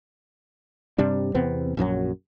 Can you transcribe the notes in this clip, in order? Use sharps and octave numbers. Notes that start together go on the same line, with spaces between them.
G2 C3 G3 D4
E2 C3 B3 C4
A#1 F#2 E3 F#3